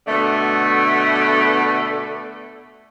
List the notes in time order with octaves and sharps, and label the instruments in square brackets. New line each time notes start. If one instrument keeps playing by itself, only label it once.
[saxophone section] B2 D3 A3